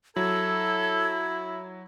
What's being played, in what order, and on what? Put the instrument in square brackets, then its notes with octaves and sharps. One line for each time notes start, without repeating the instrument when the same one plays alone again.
[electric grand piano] F#3 [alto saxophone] E4 [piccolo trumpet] A4 [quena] G#6